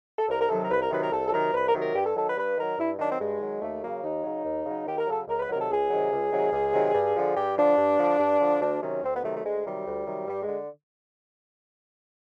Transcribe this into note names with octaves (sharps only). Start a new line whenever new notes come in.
A4
C2 A#4
A#4
C3 D#3 F#3 A4
A#4
C2 B4
A#4
C3 D#3 F#3 B4
A#4
C2 A4
A4
C3 D#3 F#3 A#4
C2 B4
A#4
C3 D#3 F#3
A#4
G2 G4
A4
D#3 F#3 A4
B4
G2 B4
D#3 F#3 A#4
G2 E4
D#3 F#3 D4
C4
G2 G#3
D#3 F#3
D#2 A3
C#3 F#3 A#3
D#2 D#4
C#3 F#3
D#2
C#3 F#3
D#2 G4
A#4
C#3 F#3 A4
C#2 A#4
B4
C3 D#3 F#3 A#4
A4
C#2 G#4
C3 D#3 F#3
C#2
C3 D#3 F#3
C#2
C3 D#3 F#3
G2
D3 F3
G2 G4
D3 F3 D4
G2
D3 F3
G2
D3 F3
D2 D4
C3 D#3 F#3 C#4
D2 C4
B3
C3 D#3 F#3 A3
A3
D2 G#3
C3 D#3 F#3 G3
D2
C3 D#3 F#3
G2 G3
G#3
D3